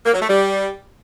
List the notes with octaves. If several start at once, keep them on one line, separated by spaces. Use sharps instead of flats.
A#3
F#3
A3
G3